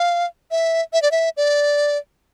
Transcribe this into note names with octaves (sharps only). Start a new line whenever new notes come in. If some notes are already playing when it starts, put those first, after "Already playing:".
Already playing: F5
E5
E5
D5
E5
D5